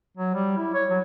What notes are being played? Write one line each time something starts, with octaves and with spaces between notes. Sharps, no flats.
F#3
G3
E4
C#5
F#3